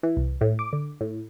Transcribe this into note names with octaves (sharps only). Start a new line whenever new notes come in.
E3
C2
A2
D6
D3
A2